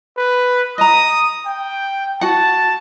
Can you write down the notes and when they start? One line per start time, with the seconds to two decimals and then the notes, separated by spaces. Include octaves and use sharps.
0.17 B4
0.78 D#5 A#5 D#6
1.46 G5
2.21 F#4 F#5 A5